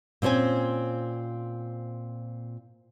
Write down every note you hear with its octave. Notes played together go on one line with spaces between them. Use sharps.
A#2 C4 C#4 C5 G#5